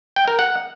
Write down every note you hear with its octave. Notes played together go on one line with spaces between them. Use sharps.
G5
A#4
F#5